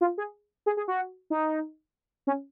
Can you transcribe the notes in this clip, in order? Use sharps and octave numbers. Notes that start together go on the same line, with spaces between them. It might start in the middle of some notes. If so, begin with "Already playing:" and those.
F4
G#4
G#4
G#4
F#4
D#4
C#4